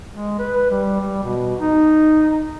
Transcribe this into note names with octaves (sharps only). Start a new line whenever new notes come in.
G#3
B4
G3
G3
B2
D#4